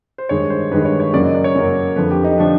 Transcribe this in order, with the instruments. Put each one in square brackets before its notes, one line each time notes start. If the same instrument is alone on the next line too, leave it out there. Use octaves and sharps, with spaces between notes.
[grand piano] C5
G2 D#3 G#3 C#5
C5
G2 D#3 G#3 B4
C#5
C#5
F#2 C#3 F#3 A#3 D5
D#5
D5
C#5
F#2 C#3 F#3 A#3
F2 D3 F3 A3 B4
G4
D#4
D3 F3 A3 D4